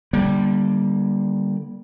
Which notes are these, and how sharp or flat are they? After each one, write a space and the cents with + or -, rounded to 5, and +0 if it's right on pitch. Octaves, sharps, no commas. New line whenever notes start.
D3 +0 G3 +0 A#3 +30